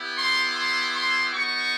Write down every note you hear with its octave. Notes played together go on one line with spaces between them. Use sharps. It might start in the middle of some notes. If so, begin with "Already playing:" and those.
Already playing: B3 E4 G4
C6
C6
C6
B3 D#4 F#4 C#6